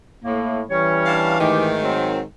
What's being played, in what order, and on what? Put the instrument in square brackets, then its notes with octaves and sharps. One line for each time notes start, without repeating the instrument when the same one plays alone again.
[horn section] A2 [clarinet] A#3
[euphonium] E3 [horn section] G3 C#4 [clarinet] C#5
[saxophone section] D4 F5
[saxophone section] G#2 D#3 [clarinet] A3 [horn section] G4
[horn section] F#3 C4